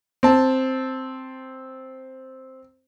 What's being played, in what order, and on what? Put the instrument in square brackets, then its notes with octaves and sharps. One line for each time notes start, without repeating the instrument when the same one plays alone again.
[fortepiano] C4 A5